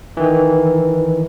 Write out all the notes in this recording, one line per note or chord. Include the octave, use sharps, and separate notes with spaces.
D#3 E3